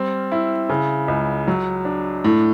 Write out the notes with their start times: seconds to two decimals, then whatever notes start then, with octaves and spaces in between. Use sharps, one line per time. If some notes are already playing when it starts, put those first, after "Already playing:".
Already playing: G3 C4
0.32 E4
0.69 C#3
1.08 C#2
1.48 F#3
1.85 D4
2.25 A2